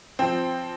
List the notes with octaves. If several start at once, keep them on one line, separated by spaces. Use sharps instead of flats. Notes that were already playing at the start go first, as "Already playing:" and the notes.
F3 C4